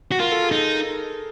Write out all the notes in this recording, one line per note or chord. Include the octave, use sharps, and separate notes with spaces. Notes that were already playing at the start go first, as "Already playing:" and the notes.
F#4
F4 A#4
A4
G#4
D#4 A4